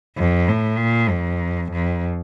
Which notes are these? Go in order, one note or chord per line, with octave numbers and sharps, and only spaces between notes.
F2
A2
A#2
F2
F2